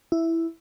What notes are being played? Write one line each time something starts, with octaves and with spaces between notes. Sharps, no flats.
E4